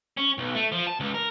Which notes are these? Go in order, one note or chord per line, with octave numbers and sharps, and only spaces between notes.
C#4
B1
A3
F3
A5
C#2
A#4